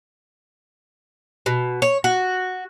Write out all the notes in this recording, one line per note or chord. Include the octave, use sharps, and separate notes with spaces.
B2
C#5
F#4